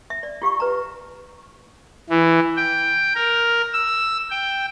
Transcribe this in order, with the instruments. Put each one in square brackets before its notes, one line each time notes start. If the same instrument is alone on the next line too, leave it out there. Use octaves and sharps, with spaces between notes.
[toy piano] E5
D5
F4 G4 F5 C#6
B4 A#5
[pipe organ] E3
G5
A#4
E6
G5